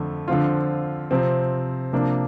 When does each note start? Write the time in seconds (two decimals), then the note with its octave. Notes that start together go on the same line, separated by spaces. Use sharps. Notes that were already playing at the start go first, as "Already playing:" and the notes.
Already playing: F2 D3 A3
0.28 D3 F3 C4 F4
1.11 C3 F3 C4
1.93 C3 F3 A#3 D4